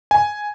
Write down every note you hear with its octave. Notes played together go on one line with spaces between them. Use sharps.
G#5